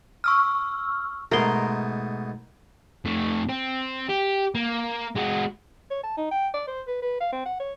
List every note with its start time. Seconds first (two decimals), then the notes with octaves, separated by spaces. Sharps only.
0.24 C#6 E6 F6
1.32 G#2 B2 A3 A#4 C6
3.05 F2 A3
3.49 C4
4.09 G4
4.55 A#3
5.16 G#3 F#4
5.90 C#5
6.03 A5
6.17 D#4
6.31 G5
6.54 D5
6.67 C5
6.87 B4
7.02 B4
7.20 F5
7.32 C4
7.45 F#5
7.60 C#5